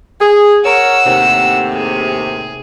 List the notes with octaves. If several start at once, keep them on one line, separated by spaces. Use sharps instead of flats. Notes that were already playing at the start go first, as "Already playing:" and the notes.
G#4
A#4 C#5 F#5 E6
D#2 A2 C3
G#4